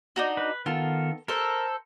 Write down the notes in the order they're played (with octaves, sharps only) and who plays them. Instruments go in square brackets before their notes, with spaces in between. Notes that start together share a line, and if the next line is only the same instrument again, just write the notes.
[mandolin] D4 D#4 F#4
[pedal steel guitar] B4
[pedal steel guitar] D#3 B3 A4 [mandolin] F4
[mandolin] A4 C5 [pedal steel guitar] A#4